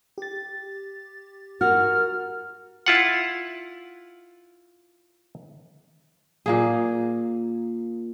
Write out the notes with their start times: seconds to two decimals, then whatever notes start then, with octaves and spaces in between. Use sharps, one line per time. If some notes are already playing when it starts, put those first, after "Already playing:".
0.18 G4 A6
1.61 F#4 A#4 F6
2.86 E4 F4 F#5
6.46 A#2 A#3 G#4